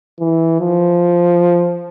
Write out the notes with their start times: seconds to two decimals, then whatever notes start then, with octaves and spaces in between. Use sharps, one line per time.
0.20 E3
0.60 F3